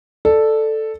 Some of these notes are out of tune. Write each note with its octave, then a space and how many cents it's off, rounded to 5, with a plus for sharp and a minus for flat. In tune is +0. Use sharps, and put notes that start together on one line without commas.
A4 +0 D5 +15